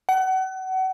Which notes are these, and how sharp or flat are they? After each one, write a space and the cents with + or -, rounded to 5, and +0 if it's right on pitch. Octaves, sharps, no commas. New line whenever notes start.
F#5 +30